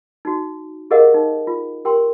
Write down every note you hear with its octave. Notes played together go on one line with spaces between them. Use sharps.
D#4 F#4
G4 G#4 A#4 D#5 F5 F#5
D#4
F4
G4 A#4 G5 C6